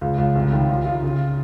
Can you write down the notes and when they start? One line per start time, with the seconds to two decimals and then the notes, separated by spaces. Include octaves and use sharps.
0.01 C#2
0.18 C#2
0.35 C2
0.52 D#3
0.69 F4
0.86 F4
1.03 C#3